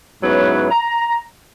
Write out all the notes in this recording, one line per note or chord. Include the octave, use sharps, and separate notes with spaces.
G#2 F#3 B3 C#4 E4 B4
A#5